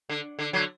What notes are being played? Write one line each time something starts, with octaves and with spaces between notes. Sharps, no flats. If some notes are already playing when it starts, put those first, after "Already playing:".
D3
D3
D3 F#3